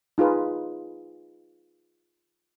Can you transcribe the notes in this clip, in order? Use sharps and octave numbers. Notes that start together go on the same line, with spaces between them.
D#4 F4 G#4 B4